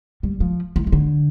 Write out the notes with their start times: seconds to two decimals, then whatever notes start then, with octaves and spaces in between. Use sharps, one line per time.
0.23 G3
0.40 F3
0.76 E3
0.87 E3
0.92 D3